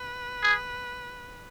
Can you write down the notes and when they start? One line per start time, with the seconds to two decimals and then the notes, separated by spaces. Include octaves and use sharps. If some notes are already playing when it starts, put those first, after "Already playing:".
Already playing: B4
0.43 G#4